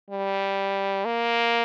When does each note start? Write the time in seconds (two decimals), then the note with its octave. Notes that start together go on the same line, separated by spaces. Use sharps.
0.11 G3
1.05 A#3